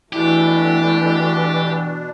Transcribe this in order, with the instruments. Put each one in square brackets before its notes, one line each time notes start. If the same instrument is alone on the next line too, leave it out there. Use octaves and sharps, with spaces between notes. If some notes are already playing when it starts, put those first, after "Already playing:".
[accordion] B2 D4 [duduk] E3 [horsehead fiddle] A3 E4 [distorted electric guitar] G4